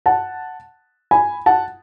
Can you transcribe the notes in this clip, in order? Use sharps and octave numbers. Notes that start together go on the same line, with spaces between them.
F#5 A5
G#5 B5
F#5 A5